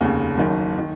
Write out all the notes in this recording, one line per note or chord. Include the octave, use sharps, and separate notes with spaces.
F1 D#2 C#3
F#1 F#2 D#3
D#3